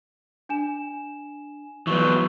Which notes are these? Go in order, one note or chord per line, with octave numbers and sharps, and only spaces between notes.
D4 G#5 E7
E3 F#3 B3 C#6 G7